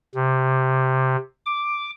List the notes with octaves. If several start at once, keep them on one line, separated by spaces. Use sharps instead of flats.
C3
D6